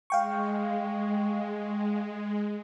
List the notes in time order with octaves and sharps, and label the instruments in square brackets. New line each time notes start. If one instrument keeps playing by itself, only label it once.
[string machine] G#3 [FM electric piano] F5 G5 C#6